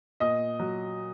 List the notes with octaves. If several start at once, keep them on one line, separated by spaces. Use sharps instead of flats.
A#2 D#5 D#6
F#3